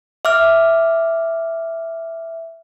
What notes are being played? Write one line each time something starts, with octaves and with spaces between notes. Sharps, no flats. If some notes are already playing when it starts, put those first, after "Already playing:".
E5 D6 F6